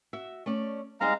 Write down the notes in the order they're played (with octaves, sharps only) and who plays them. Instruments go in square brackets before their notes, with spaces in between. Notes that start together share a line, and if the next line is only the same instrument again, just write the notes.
[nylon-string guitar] F#4 E5
A3 C#4 D5
[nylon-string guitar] G3 C4 D#4 [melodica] G#3 F5 A#5